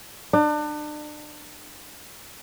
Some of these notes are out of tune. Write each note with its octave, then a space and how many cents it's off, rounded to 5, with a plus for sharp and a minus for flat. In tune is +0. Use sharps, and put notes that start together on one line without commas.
D4 +35